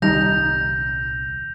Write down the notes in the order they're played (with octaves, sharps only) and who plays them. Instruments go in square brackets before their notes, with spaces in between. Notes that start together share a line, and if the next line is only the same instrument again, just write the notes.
[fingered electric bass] D#1 C2 D#3 [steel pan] G3 D#4 [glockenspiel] G6 A#6 F7